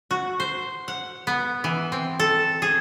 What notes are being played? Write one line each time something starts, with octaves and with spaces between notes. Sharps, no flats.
F#4
C5
F#5
B3
E3
C4
A4
G#4